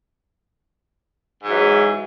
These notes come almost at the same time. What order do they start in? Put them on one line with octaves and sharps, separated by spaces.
G#2 F#3 E3 G#3